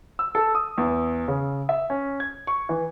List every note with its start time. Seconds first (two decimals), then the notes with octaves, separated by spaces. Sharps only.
0.19 E6
0.35 A4
0.55 D#6
0.78 E2
1.28 C#3
1.69 E5
1.90 C#4
2.20 G#6
2.47 C#6
2.69 E3